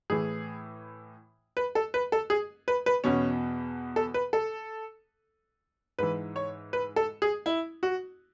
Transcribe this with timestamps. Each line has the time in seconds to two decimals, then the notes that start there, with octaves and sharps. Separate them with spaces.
0.10 A2 E3 G#4
1.57 B4
1.75 A4
1.94 B4
2.12 A4
2.30 G#4
2.68 B4
2.86 B4
3.04 E2 B2 C#4
3.96 A4
4.14 B4
4.33 A4
5.99 G#2 E3 B4
6.36 C#5
6.73 B4
6.96 A4
7.22 G#4
7.46 E4
7.83 F#4